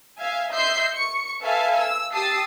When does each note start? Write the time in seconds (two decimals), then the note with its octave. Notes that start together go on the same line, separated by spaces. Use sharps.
0.19 E5 F5 G#5
0.53 D#5 E5 C6 E6 G6 C7
0.94 C#6 C#7
1.42 A4 B4 E5 F5 G#5 A5
1.78 E6
2.13 G4 A5 D#6 E6 A6 C7